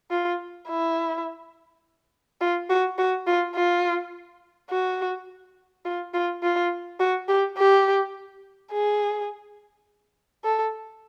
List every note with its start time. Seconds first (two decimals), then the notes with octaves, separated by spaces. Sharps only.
0.11 F4
0.68 E4
2.41 F4
2.70 F#4
2.98 F#4
3.27 F4
3.55 F4
4.70 F#4
5.85 F4
6.14 F4
6.42 F4
7.00 F#4
7.28 G4
7.57 G4
8.72 G#4
10.44 A4